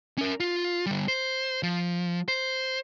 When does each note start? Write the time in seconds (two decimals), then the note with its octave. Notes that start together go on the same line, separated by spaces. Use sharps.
0.18 C#4 A#4
0.40 F4
0.86 D3 G3
1.08 C5
1.63 F3
2.28 C5